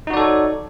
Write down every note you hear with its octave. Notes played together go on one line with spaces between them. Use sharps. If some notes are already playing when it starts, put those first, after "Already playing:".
D#4 F#4 A4 C#5 D5